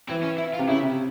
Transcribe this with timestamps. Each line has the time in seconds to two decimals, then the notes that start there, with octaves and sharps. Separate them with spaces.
0.09 E3 C4
0.23 C#4
0.38 E4
0.54 F4
0.59 C3
0.68 C#3 E4
0.83 C3